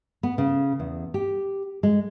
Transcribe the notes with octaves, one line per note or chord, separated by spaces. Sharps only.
B3
C#3
E2
G4
G#3